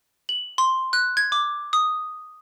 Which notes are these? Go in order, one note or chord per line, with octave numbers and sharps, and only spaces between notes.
F#7
C6
F#6
G#6
D6
D#6